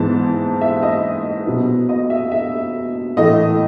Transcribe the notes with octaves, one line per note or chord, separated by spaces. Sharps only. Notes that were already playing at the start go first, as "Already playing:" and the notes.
Already playing: G#2 E3 G#3 B3 A5
E5
D#5
B2 F#3 B3
D#5
E5
E5
A2 E3 A3 D#5